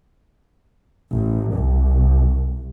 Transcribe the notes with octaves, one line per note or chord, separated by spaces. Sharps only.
A1
C2